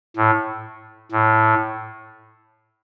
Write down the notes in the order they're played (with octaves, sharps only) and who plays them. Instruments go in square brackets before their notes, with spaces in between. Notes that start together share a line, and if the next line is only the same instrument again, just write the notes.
[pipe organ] A2
A2